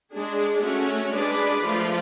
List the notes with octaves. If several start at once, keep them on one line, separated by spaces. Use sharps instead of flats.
G#3 D4 G#4
A3 C#4 F#4 C#5
G#3 D4 G#4 B4 D5
F3 A3 F4